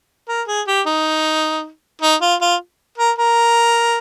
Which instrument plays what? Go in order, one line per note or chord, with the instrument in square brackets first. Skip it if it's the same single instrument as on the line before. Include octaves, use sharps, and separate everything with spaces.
[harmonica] A#4
G#4
G4
D#4
D#4
F4
F4
A#4
A#4